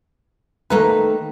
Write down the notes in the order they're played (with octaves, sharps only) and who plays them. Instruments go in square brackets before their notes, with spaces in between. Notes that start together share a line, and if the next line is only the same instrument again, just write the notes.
[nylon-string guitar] D#3 A3 [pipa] A#3 D#4 B4